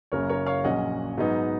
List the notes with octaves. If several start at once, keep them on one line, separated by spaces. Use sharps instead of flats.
F#1 F#2 C#3 F#3 A#3 A#4 C#5
A#4 C#5
C#5 F5
A#1 A#2 F#3 C#4 D#5 F#5
G#2 F#3 B3 D#4